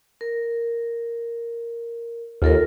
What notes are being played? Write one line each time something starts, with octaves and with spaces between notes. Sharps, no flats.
A#4
D#2 F4 A4 A#4